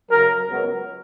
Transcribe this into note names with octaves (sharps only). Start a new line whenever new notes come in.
F#2 C#3 F#3 A#4
C#2 C#3 F#3 B3